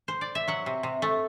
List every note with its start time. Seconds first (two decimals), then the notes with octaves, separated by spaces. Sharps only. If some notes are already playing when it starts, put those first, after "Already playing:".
0.08 C5
0.21 D5
0.35 E5
0.48 F#3 F#5
0.66 C3
0.83 C3
1.02 A3